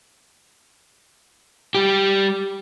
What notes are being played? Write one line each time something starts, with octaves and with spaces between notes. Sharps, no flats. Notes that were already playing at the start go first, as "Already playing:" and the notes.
G3 G4